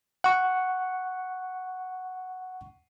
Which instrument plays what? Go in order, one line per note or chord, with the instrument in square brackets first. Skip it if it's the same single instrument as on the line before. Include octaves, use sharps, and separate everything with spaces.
[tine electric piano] F#5 C#6